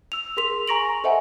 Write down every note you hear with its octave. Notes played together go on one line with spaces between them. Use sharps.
E6 F7
G#4 A#4 C6 B6 F7
G#5 A#5 C#6 A#6 D7 F#7
A4 C5 D#5 E5 F#5 G#5